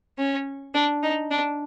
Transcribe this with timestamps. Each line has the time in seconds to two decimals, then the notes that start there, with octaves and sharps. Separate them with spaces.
0.18 C#4
0.74 D4
1.03 D#4
1.31 D4